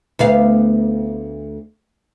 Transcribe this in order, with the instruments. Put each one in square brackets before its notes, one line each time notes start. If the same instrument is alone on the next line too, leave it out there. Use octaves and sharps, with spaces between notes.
[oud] D2 B3 F5